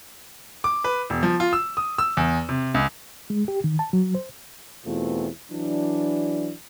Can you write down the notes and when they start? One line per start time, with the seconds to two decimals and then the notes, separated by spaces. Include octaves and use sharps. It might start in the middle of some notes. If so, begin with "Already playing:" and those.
0.64 D6
0.84 B4
1.10 E1
1.23 F3
1.40 F4
1.53 E6
1.77 D#6
1.98 E6
2.17 E2
2.49 C3
2.74 C#2
3.30 G#3
3.48 G4
3.64 D#3
3.79 A5
3.93 F#3
4.15 C5
4.84 E2 B2 A3 C4 F4
5.51 E3 F#3 D4